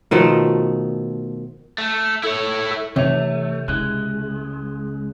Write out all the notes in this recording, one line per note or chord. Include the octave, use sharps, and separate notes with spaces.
B2 D#3 F3 A3
A3
E4 A4 C#5
C3 E3 A3 D#4 C#5 E5 F7
C#2 G#3 E4 F#6